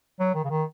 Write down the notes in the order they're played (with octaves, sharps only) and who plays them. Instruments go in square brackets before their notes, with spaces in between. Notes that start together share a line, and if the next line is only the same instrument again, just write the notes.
[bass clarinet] F#3
D#3
C#3
D#3